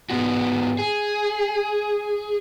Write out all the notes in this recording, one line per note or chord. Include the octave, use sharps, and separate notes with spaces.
G#2 B3 F#4
G#4